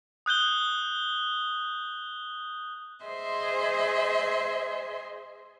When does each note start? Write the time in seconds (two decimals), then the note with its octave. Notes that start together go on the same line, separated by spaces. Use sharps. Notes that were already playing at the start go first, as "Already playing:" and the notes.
0.26 D#6 F#6 G6 G7
3.03 G#4 C5 D#5 E5 C6